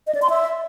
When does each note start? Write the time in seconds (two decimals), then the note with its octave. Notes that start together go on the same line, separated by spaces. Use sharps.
0.07 D#5
0.15 D5
0.22 C6
0.30 E5